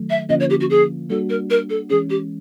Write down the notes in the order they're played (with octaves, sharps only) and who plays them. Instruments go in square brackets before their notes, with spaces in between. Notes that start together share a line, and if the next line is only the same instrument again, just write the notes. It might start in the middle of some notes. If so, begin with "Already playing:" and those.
Already playing: [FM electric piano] D#3 F#3 A3
[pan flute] E5
[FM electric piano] D3 F3 A#3 C#4 F4 [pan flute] D#5
[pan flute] C#5
G4
F#4
G#4
[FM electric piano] G3 A#3 D4 F#4 [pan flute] A4
[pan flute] A#4
A#4
A4
[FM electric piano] E3 G#3 C#4 [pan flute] G#4
[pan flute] G4